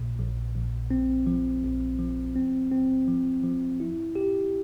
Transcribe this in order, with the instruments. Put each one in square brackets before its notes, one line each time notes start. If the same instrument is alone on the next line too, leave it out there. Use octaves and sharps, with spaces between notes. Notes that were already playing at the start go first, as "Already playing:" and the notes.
Already playing: [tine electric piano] A#1 A#2
A#1
A#1
C4
F3
A#1
F3
C4
C4
F3
F3
E4
G4